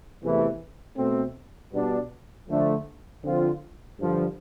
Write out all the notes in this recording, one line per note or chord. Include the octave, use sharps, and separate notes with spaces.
E2 C3 E3 A3
B2 A3 C4
B2 G3 B3 D4
D3 F3 A3 D4
D3 F3 C4 F4
G2 D3 F3